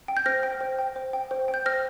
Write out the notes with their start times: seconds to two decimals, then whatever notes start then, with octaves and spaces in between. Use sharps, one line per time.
0.08 G5
0.17 G6
0.26 C5 F6 A#6
0.43 G5
0.61 C5
0.79 G5
0.96 C5
1.13 G5
1.31 C5
1.48 G5
1.54 G6
1.66 C5 F6 A#6